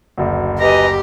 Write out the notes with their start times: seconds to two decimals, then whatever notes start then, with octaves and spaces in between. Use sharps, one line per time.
0.18 F#1 D2
0.60 G4 B4 D#5 G#5 A#5